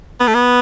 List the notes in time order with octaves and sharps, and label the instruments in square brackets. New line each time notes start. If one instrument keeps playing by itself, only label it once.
[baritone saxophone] B3
A3
B3